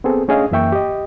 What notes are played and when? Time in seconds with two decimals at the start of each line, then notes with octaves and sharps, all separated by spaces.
0.04 B3 C4 G#4 A4
0.28 A3 C#4 D4 G#4 D#5 F5
0.51 F#2 E3 A#3 E5 G5 C#6
0.72 G4 D#5